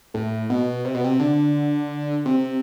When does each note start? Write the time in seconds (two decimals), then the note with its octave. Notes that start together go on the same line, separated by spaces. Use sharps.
0.14 A2
0.50 B2
0.85 C3
0.94 B2
1.04 C3
1.20 D3
2.26 C3